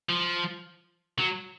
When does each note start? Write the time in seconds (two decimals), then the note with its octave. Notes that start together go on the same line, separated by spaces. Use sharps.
0.09 F3
1.18 F#3